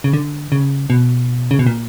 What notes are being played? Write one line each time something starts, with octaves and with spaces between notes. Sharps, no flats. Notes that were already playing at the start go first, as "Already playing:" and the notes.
C#3
D3
C#3
B2
C#3
B2
A#2